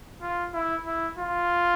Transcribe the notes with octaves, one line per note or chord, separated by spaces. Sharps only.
F4
E4
E4
F4